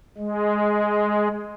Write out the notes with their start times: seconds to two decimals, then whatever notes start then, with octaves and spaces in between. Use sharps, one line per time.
0.18 G#3